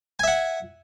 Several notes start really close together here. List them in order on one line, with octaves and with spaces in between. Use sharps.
G#5 E5 F#5